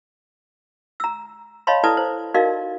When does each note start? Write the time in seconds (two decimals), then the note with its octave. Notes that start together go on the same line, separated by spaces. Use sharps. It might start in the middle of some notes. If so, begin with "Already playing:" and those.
1.00 A#5 E6
1.67 C#5 D#5 F5 A5 B5 C6
1.84 E4 A4 B4 D5 A5 D#6
1.97 C5
2.34 D#4 F#4 A#4 D5 D#5 F5